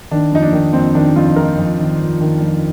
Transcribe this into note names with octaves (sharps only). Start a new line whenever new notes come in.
D#3 D4
F2 D#4
D4
D#3
F2 C4
D#3 D4
F2 F4
D#3 A#4
F2
D#3
F2
D#3
F2